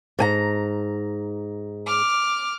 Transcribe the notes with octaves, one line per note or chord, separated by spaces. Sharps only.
G#2 G#5 A#5
D6 F6